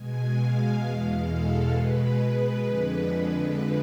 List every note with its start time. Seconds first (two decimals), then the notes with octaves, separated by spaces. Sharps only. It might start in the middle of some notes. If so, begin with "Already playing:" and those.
Already playing: B2 G#3 G#5
0.36 F5
0.81 E2 B2 G#3 F5
1.27 A4
1.73 B2 G#3 B4
2.64 F2 D3 G#3